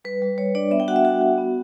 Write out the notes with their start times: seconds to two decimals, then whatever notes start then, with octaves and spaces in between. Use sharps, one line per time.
0.05 G3 B4
0.22 G3
0.38 G3 C#5
0.55 D4 D5
0.71 B3 E5
0.80 G5
0.88 F#4 F#5
0.96 E5
1.05 F#4
1.21 F#4
1.38 B3